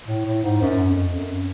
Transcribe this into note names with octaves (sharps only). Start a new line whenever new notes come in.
A2
A2
G#2
F#2
F2
F#2